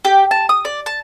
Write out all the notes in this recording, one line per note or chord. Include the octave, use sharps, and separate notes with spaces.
G4
A5
D#6
D5
A5